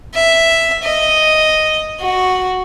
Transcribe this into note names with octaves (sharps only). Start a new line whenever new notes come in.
E5
D#5
F#4